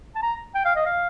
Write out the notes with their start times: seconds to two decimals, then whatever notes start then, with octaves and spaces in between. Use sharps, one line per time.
0.15 A5
0.22 A#5
0.55 G5
0.65 F5
0.76 D#5
0.86 F5